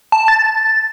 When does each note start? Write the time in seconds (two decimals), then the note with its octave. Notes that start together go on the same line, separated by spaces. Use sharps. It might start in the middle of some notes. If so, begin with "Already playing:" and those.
0.12 A5
0.28 A6